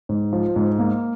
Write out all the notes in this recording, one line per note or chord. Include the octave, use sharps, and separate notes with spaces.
G#2
F3
G#2
A#3